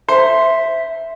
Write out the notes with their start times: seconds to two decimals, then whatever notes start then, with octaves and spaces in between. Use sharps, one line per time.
0.09 C5 E5